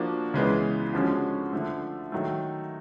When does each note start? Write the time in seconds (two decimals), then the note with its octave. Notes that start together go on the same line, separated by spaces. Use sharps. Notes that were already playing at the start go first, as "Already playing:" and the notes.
Already playing: F3 A#3 D4 F#4
0.33 C#2 C#3 E3 G#3 B3
0.93 D3 F3 G#3 C#4 F#4
1.53 D3 F3 A3
2.12 D#3 F#3 A3